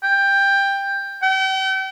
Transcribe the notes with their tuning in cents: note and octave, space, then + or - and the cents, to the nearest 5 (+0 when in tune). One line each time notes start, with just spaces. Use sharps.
G5 +15
G5 -40